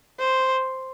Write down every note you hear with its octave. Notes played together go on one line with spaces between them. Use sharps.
C5